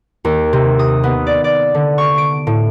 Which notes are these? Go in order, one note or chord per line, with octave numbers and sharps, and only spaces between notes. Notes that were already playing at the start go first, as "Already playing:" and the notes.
D#2
C3
D#6
B3
D5
D5
D3
C#6
D7
A2